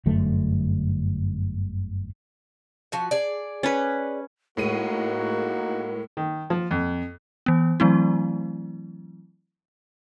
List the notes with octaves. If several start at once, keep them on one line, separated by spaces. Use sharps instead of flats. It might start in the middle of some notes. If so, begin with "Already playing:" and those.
G1 F#2 D3 A3
F3 F#4 F#5
G#4 D5
C#4 B4
A2 G#3 A#3 D#4 F#4 A#4 D#7
D#3
F3
F2
E3 B3
E3 F#3 A3 C4 E4